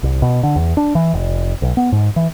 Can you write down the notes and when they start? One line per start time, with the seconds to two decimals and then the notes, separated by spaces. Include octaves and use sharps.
0.03 C2
0.22 B2
0.43 D3
0.56 E2
0.77 D4
0.95 E3
1.14 F1
1.62 B1
1.77 B3
1.92 G#2
2.16 E3